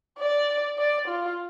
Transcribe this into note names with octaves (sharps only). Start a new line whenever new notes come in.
D5
D5
F4